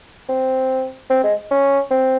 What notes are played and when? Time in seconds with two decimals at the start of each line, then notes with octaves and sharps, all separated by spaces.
0.29 C4
1.10 C4
1.24 G#3
1.51 C#4
1.91 C4